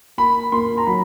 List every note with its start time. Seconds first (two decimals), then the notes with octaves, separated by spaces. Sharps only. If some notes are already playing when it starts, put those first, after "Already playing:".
0.18 A#3 B5
0.52 A#3 C6
0.78 A#5
0.87 F#3 B5